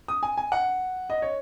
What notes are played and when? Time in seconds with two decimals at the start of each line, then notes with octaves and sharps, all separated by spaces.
0.08 D#6
0.23 G#5
0.37 G#5
0.52 F#5
1.10 D#5
1.22 C#5